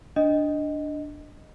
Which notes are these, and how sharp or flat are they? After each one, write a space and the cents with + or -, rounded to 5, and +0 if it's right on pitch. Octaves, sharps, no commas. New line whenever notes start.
D4 +0 D#5 +0